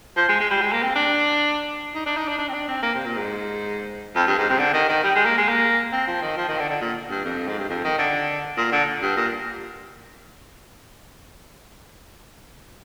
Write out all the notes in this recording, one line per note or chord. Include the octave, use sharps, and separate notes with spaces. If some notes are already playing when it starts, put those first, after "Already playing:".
F3
G#3
G#3
G3
G#3
A#3
C4
D4
D#4
D4
D#4
D4
D4
C4
D4
C4
A#3
C3
A#2
G#2
F2
G2
G#2
C3
D3
D#3
D#3
G3
G#3
A#3
G#3
A#3
C4
F3
D#3
F3
D#3
D3
D3
A#2
G2
F2
G#2
G2
F2
D#3
D3
A#2
D3
G2
A#2